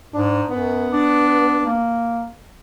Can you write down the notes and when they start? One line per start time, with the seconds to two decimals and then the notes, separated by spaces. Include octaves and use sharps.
0.14 G#2 D4
0.50 F#2 B3
0.91 D4
1.66 A#3